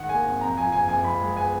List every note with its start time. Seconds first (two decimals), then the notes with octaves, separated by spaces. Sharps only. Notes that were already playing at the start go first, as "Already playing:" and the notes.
Already playing: G#2 D#3 F#5
0.09 A#3 G#5
0.26 G#1
0.41 F2 A#5
0.57 F3 G#5
0.72 F#1 G#5
0.88 F#1 G#5
1.04 F3 B5
1.20 G#3
1.37 B3 G#5